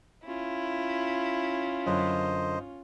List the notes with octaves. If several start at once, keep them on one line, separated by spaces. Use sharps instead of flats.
C#4 E4 F4
F#2 D3 C5 D#5